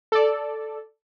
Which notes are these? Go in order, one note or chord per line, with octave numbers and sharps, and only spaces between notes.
A4 D5